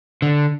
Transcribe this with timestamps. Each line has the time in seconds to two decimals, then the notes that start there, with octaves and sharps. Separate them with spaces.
0.22 D3